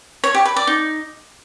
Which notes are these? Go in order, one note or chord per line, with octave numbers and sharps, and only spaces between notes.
C#5
G4
B4
D5
D#4